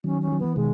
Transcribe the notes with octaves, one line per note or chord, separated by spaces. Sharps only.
D#3 F#3 C#4
C#4
F#3
E3 B3
B2 D#3 G#3